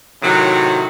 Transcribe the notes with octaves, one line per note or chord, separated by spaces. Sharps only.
A2 C3 D#3 F#3